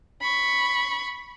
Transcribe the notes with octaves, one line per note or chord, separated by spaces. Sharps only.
B5 C#6